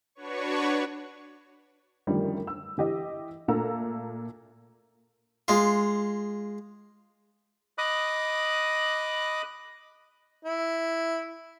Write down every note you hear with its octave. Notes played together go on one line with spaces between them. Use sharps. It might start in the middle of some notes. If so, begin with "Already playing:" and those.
D4 F#4 B4 C#5 C#6
F#2 D3 D#3 F3 G3 A3
E6
E3 G4 D#5
A#2 A3 A4 F5 A#5 E6
G#3 F4
D#5 B5 D6 D#6 F#6
E4